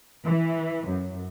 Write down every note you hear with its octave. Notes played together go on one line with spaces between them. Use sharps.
E3
F#2